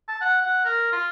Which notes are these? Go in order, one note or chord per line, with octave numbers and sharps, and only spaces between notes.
A5
F#5
F#5
A#4
F4